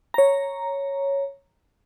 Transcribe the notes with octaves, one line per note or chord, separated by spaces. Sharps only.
C#5 A#5